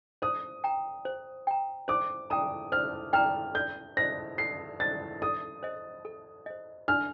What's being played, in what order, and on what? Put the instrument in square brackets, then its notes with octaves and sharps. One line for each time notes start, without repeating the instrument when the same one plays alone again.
[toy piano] C5 [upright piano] D#6
[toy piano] G5 A#5
C5
G5 A#5
[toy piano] C5 [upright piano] D6
[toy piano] G5 A#5 [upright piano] D#6
[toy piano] C5 [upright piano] F6
[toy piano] G5 A#5 [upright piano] F6
[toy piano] A4 [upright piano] G6
[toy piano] C5 D#5 [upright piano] A#6
[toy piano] A4 [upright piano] C7
[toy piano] C5 D#5 [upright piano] A6
[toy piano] A4 [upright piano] D#6
[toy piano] C5 D#5
A4
C5 D#5
[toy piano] D4 [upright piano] F6